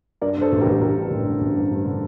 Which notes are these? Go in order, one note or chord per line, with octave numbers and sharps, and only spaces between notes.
G2 A#4 D5
G2 A4 C5
A1
G4 A#4
A1
A1 G4 A#4
G2
A1
D3
A1
G2
G2
D3